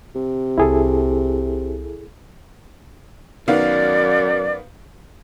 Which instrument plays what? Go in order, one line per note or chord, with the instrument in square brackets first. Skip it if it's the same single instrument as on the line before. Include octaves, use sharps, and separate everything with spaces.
[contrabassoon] C3
[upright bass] C2 [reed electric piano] E4 G#4 A4
[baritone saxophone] F#2 [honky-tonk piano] D#3 B3 F5 [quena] D5